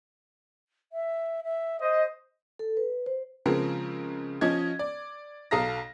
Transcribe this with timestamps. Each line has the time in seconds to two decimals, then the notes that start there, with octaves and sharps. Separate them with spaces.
0.92 E5
1.44 E5
1.80 C5 D#5
2.59 A4
2.77 B4
3.06 C5
3.46 C#3 F3 G#3 C4 A#4
4.41 F3 C#4 D#5 G#6
4.79 D5
5.51 B1 A4 F5 A#5 D#6 A#6